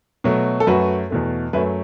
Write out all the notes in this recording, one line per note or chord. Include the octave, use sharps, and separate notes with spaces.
B2 F#3 A3
A4
F#2 F#3 A3 F#4 B4
E2 B2 A3
F#2 F#3 A3 B4 E5